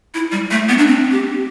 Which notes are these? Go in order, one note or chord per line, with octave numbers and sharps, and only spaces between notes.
E4
G3
A3
B3
D4
C4
G4